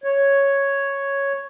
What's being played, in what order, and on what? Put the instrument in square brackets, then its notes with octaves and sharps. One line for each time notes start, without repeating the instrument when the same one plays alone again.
[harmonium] C#5